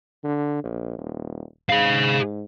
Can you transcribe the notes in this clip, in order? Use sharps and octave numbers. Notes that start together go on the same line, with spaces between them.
D3
A#1
D#1
G#2 G#4 F5